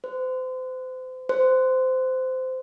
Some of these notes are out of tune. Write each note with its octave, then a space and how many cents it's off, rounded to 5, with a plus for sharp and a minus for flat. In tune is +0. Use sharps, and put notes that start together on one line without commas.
C5 -35
C5 -20